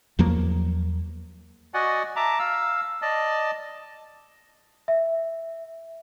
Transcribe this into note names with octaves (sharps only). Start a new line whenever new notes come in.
E2 F3 F#3 A#3
F#4 D5 D#5 F#5 G#5
E5 A5 A#5 D6
F5 E6
D5 D#5 A5
E5